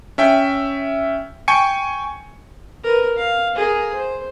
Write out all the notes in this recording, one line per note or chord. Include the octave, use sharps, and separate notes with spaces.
C#4 E5 G5
G5 G#5 C#6 C#7
A#4 B4
F5
G#4 A#4
C5